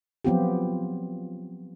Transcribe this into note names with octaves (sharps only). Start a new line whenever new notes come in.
F3 F#3 B3 C4 F4 G4